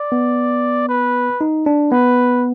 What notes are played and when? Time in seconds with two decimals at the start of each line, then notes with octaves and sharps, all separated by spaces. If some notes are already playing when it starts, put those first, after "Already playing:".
Already playing: D5
0.12 B3
0.89 B4
1.41 D#4
1.66 D4
1.92 B3 B4